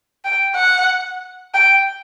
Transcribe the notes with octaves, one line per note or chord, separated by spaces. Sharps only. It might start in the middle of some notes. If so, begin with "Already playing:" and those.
G5
F#5
G5